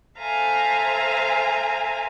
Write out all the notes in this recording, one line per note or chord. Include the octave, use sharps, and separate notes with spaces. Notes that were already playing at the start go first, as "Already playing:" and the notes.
A4 C5 E5 F5 G#5 A#5